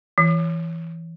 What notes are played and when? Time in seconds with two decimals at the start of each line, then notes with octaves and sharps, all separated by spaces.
0.18 E3